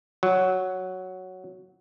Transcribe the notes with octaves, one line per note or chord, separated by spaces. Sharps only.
F#3